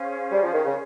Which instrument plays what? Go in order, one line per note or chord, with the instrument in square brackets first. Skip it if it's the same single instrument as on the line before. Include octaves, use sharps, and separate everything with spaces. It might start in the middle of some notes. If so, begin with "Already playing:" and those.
Already playing: [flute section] C#4 G#4 C5 F5
[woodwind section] G3
F3
D#3
C#3